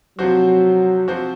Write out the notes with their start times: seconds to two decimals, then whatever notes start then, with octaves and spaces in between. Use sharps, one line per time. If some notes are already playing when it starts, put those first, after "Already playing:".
0.19 C3 F3 F#3 C4 F#4 C5
1.07 C3 F3 C4 F#4 C5